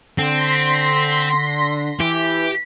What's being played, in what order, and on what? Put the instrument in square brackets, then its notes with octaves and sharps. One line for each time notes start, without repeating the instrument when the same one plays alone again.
[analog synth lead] D3 [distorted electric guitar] C4 [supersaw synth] C6 A#6 B6
[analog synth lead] E3 [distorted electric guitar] G4